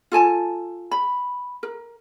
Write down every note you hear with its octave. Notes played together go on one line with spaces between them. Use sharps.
F4 A4 G#5 A5
B5
A#4